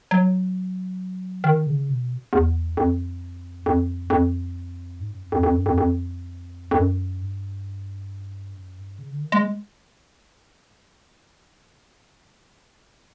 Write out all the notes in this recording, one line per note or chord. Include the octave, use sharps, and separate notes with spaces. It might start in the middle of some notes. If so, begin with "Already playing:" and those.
F#3
D#3
C#3
B2
E2
F2
F2
F2
G#2
F#2
F2
F2
F2
F#2
F2
F2
F2
F#2
G2
F#2
G2
C#3
D3
D#3
G#3